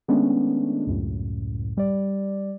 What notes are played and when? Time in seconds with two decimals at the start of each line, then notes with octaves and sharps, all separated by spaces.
0.08 D#3 G#3 A3 B3 C#4 D4
0.87 C#2 F#2 A2
1.77 G3 D5